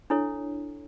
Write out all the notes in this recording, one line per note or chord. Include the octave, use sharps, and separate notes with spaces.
D4 E4 A4 C#5